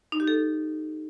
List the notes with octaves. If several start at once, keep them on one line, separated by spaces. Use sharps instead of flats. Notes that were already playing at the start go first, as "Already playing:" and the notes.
D#4
G4
A4